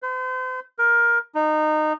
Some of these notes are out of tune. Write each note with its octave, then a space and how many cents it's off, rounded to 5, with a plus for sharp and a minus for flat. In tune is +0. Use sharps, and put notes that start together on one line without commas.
C5 -40
A#4 +15
D#4 -20